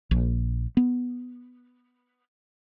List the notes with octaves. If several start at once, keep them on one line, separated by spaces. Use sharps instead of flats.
A#1
B3